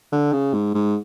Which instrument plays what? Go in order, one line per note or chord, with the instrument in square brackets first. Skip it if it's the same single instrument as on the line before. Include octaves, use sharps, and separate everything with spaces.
[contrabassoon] D3
C#3
G#2
G#2